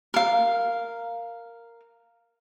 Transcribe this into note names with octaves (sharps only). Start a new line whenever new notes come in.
A#4 F5